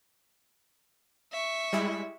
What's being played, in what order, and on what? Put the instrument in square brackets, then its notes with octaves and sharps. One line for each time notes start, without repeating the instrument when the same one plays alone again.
[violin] E5 C#6
[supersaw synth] G3 G#3 E4